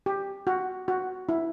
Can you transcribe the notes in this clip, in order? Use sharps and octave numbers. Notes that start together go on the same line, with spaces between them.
G4
F#4
F#4
E4